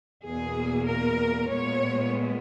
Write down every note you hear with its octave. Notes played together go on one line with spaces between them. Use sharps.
E2 B2 A#3 G#4
A#4
A#2 G#3 B3 C#5